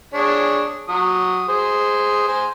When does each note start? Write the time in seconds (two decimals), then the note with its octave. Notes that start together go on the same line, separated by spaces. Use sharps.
0.14 D4 G#4 C#5
0.88 F#3 D#6
1.48 G#4 C5
2.28 C5 G#5